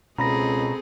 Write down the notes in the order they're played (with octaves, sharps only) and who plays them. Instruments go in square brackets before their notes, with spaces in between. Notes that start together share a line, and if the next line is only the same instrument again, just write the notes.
[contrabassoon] C#2 [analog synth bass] B2 [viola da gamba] C4 G#4 A4 [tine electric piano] A#5 B5 A#6